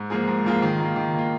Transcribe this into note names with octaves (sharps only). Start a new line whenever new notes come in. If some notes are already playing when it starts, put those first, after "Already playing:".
Already playing: G#2
F3 A#3 F4 G#4
G#2
F3 A#3 F4 G#4
D#3
A#3 F4
D#3
A#3 F4